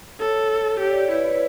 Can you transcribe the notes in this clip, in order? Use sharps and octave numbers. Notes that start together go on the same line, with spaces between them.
A4 C#5
G4 C#5
D5
C#5
E4 B4
C#5
B4